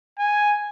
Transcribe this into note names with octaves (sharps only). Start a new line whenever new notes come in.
G#5